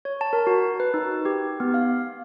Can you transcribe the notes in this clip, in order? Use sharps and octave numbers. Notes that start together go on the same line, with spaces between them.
C#5
A5
A#4
F#4
B4
D#4
G4
B3
F5